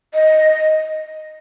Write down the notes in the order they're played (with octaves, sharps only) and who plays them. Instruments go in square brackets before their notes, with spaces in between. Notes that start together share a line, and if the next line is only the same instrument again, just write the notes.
[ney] D#5